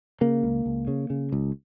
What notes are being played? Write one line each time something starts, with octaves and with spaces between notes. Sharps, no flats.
C#3 A#3
C#2
C#2
C#3
C#3
C#2